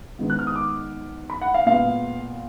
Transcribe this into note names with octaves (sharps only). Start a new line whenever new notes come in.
G#2 D#3 G#3 B3
F#6
F6
D#6
D6
B5
F#5
F5
A#2 G#3 B3 F5